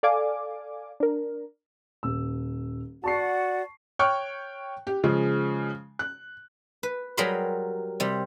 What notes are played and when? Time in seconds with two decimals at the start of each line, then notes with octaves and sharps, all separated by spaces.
0.03 A4 D5 F5 G#5 D6
1.00 D4 A#4
2.03 D#1 E6
3.04 F#4 D5 F#5 A5 C#6 C7
3.99 C#5 G5 C#6 F6 F#6
4.87 G4
5.04 C#3 F3 G#3
5.99 F#6
6.83 B4
7.17 F#3 G3 G#4 A#4 B5 C6
8.00 C3 G3